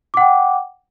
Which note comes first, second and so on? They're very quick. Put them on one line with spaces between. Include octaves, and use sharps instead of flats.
D6 F#5 G5